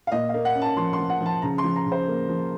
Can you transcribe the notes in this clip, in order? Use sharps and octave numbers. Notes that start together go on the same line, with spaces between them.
F5
A#2 D#5
F5
A#3
F#5
C#4
A5
F3 C6
C6
F3
F#5
F3 A5
C#3 A#5
C6
F3
A#5
C#3
C5
A#3
F3